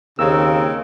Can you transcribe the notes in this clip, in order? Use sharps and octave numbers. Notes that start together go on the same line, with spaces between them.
D#2 C#3 C4 A#4 E6